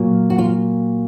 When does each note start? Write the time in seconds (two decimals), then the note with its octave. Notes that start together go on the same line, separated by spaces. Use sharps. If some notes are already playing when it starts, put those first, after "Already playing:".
Already playing: A#2 F#3 A#3
0.30 F#4
0.38 F4